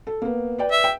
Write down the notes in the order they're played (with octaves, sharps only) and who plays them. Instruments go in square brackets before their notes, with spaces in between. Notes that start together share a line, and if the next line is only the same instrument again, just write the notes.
[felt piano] A4
A#3 B3
B4 D5 G5
[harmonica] E5
[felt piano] G5